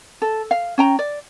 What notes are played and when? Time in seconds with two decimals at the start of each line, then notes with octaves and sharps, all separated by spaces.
0.22 A4
0.51 F5
0.78 C#4 G5 A#5
0.99 D5